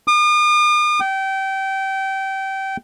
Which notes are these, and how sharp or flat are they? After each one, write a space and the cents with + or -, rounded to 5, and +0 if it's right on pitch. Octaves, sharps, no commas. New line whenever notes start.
D#6 -45
G5 -25